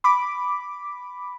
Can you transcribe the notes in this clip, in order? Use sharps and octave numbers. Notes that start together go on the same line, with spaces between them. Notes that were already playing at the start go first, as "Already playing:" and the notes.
B5 D6